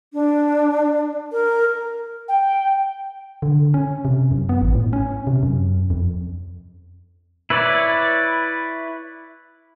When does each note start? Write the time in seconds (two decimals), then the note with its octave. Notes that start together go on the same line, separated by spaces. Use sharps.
0.14 D4
1.32 A#4
2.28 G5
3.42 D3
3.74 C#4
4.05 C3
4.31 F#2
4.49 B3
4.62 A1
4.75 A2
4.93 C#4
5.27 C3
5.43 F#2
5.90 F2
7.50 E4 B4 C#5 D5